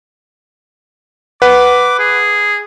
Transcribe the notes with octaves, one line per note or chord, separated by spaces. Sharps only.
B4 F#5 D6
G#4